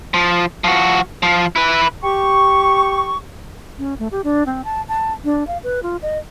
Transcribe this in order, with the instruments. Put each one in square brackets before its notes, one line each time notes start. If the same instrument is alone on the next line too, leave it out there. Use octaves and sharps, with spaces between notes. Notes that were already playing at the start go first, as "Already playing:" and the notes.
[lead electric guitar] F3
F3 F#4
F3
E4 B4
[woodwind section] G4 C#6
[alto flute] C#4
A3
G4
D4
C4
A5
A5
D4
F5
B4
F4
D#5